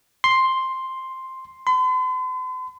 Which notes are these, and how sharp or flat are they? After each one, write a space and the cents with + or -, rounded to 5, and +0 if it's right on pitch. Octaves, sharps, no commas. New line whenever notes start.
C6 +5
C6 -45